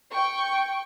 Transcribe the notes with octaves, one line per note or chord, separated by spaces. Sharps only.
G5 C#6